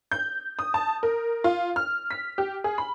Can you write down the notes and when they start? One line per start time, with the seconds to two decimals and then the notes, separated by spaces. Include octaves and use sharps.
0.12 G6
0.59 D#6
0.74 A5
1.03 A#4
1.44 F4
1.76 F6
2.11 B6
2.38 G4
2.64 G#4
2.78 B5